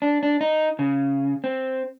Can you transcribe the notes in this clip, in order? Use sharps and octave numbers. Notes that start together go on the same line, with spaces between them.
D4
D4
D#4
C#3
C4